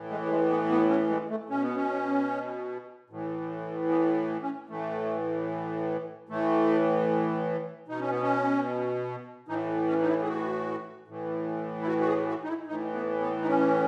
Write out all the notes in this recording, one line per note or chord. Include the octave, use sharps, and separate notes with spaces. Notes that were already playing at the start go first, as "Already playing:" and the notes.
Already playing: A2 E3
G#3
A3
G#3
B3
B3
C#4
G#3
A3
B2 C#4
B3
C#4
A2 E3
B3
C#4
A2 E3 A3
A2 E3 A3
B2 D#4
C#4
B3
C#4
A2 E3 D#4
C#4
D#4
E4
G#4
F#4
A2 E3
E4
F#4
F#4
G#4
F#4
D#4
E4
A2 E3 D#4
B3
B3
D#4
C#4